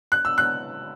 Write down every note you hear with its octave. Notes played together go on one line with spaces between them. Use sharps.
F#6
E6
F#6